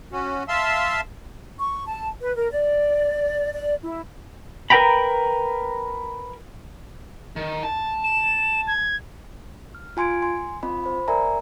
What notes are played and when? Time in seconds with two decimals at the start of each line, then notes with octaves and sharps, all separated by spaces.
0.12 C#4 F#4
0.48 E5 F5 A5 C6 E6
1.59 C#6
1.86 A5
2.21 B4
2.35 A#4
2.52 D5
3.54 D5
3.83 E4
4.70 A#4 B4 D#5 G5 A#5 B5
7.36 D#3
7.63 A5
8.04 E7
8.67 G#6
9.75 F6
9.97 F4 G#5 C6 G#6 D7
10.22 G#5 C6
10.63 C4 F4 D#5 B5
10.84 C5 B5
11.08 A#4 D5 E5 G#5 A#5